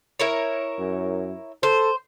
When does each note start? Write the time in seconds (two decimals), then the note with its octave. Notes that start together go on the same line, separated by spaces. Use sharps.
0.19 E4 A#4 C#5
0.79 F#2
1.63 A4 C5